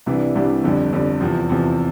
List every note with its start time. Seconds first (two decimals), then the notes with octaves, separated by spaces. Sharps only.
0.06 C2 C3 E3 G3 D4
0.35 C2 C3 E3 G3 D4
0.63 G1 F2 D3 G3
0.93 G1 F2 D3 G3
1.21 E2 C3 F3
1.49 E2 C3 F3